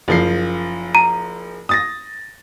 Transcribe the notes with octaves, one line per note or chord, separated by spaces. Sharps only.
F#1 F3 C7
A#5
D#6 A6 A#6